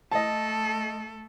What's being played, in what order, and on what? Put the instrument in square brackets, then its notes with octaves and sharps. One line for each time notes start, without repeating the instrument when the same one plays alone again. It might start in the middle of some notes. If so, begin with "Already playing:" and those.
[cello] A3 A4 [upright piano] D#5 A5